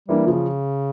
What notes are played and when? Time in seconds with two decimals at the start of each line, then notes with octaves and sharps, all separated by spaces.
0.08 E3 G3 A#3 D4
0.27 C#3 F3